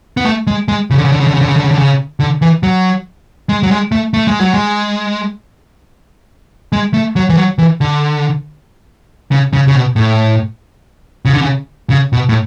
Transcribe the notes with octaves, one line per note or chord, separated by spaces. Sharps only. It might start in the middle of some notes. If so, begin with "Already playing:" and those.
B3
A3
G#3
G#3
C#3
D3
C#3
D3
C#3
D3
C#3
D3
C#3
D3
C#3
D3
C#3
D3
E3
F#3
G#3
F#3
G#3
A3
A3
G#3
F#3
G#3
G#3
A3
F#3
E3
F#3
E3
D3
C#3
C#3
C#3
B2
A2
C#3
D3
C#3
C#3
B2
A2